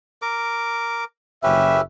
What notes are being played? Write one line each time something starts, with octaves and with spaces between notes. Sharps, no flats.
A#4 D6
F#1 C#4 G4 B4 E5